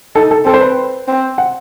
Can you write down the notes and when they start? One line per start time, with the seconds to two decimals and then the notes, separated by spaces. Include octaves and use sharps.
0.15 D#4 A4
0.31 A4
0.46 C4 A4
0.54 C5
0.61 B4
1.08 C4
1.38 F#5